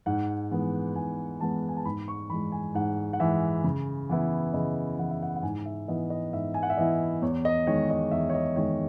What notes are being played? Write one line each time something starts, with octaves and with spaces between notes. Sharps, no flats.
G#2 F#5
E3 G#3 B3
G#2 G#5
E3 G#3 B3 A5
G#5
A5
G#2 B5
C#6
E3 G#3 B5
G#5
G#2 F#5
F#5
E3 G#3 E5
C#3
E3 B3 E4
C#3 D#5
E3 B3 E4 F#5
E5
F#5
F#5
G#2 G#5
E5
E3 B3 E4 D#5
D#5
G#2 E5
G#5
F#5
E5
E3 B3 E4 D#5
E2 C#5
D#5
D#3 G#3 C#5
D#5
E2 E5
C#5
D#5
D#3 G#3 C#5